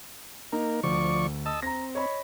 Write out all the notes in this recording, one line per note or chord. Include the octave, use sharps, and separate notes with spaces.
A#3 D#4 A#4
D2 F3 D5 C#6
D#5 A5 E6
C4 A#5 A#6
C#5 D#5 B5